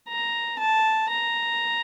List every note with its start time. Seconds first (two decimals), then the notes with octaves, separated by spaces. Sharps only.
0.08 A#5
0.59 A5
1.10 A#5